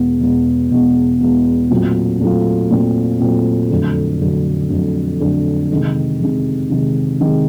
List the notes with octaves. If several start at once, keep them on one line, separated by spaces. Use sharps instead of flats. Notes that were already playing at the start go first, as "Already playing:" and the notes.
Already playing: E2 B2 G#3 B3
E2 B2 G#3 B3
E2 B2 G#3 B3
E2 B2 G#3 B3
A#2 F#3 A3 C4 F4
A#2 F#3 A3 C4 F4
A#2 F#3 A3 C4 F4
A#2 F#3 A3 C4 F4
F2 D3 F#3 A3
F2 D3 F#3 A3
F2 D3 F#3 A3
F2 D3 F#3 A3
C3 D#3 G#3
C3 D#3 G#3
C3 D#3 G#3
C3 D#3 G#3